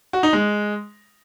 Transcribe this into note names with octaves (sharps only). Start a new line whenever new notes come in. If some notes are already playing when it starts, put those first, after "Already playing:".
F#4
D#4
G#3